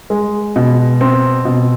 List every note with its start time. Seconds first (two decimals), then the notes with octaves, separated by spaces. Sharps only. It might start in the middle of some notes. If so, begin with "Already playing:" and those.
0.10 G#3
0.56 B2
1.01 C4
1.45 B2